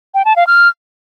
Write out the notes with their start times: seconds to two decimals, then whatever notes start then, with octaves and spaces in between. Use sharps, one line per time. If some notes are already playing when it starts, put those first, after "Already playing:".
0.14 G5
0.25 A5
0.36 F5
0.47 F6